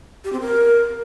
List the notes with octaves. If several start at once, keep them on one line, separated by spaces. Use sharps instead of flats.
G4
C4
A#4